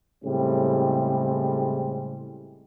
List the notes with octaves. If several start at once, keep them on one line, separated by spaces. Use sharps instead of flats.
A2 C#3 G3 G#3 C4